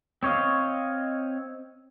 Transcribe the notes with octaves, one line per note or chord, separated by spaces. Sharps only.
C4 C#5 D#5 F5